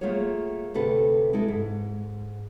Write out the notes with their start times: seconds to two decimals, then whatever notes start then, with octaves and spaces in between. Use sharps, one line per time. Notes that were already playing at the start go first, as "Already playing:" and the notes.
0.01 A3 A#3 F4 F#4 G#4 C#5
0.74 D2 C3 A3 C4 A4 B4
1.33 G#3 E4 A4
1.48 G#2